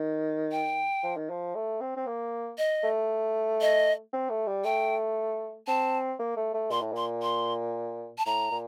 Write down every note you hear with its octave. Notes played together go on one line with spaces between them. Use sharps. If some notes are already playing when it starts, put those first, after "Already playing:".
Already playing: D#3
G5
F3
D#3
F3
A3
C4
C4
A#3
D#5
A3
D#5
C4
A3
G3
A3 G5
C4 A5
A#3
A3
A3
A#2 C6
A2
A#2 C6
C6
A5
A2 A#5
A#2